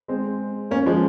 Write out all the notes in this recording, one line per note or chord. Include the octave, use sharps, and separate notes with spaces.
G#3 C4
A#3 C#4
F3 G#3